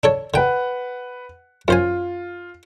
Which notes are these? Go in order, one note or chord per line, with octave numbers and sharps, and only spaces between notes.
D4 A4 C#5
D3 B4 F#5 G5
F#2 F4 C5 G#5